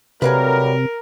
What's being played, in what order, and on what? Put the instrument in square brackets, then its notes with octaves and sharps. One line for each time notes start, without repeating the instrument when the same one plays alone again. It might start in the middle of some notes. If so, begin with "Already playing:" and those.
[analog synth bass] C3 [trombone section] F#3 G3 A3 [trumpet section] A#4 [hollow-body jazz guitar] B4 F5 G#5